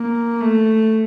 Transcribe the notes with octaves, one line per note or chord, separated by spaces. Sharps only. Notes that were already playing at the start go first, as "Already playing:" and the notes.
Already playing: A#3
A3